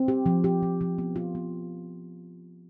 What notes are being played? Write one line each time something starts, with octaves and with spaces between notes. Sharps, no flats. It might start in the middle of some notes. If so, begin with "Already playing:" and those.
Already playing: C4
G4
F3
G4
F3
F3
B3
F4
B3